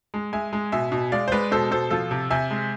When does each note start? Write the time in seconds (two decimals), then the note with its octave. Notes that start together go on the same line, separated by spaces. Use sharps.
0.14 G#3
0.33 G#3 E5 G#5
0.53 G#3
0.72 B2 E5 G#5
0.92 B2
1.12 G#3 D5 F5
1.28 C5
1.31 G#3 B4 D5
1.51 B2 A4 C5
1.71 B2 A4 C5
1.90 F3 F4 A4
2.11 C3
2.30 C3 E5 G#5
2.50 G#3